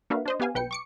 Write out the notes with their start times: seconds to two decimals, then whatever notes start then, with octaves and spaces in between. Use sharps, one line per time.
0.10 A#3 D4 F#4 B4 E5 F5
0.26 D4 C5 D#5
0.40 B3 G4 F5 G#5
0.55 B1 B4 G5 C#7
0.71 C#6 D6 C#7